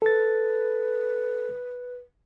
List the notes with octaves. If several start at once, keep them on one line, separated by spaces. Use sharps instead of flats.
A4 B4 A6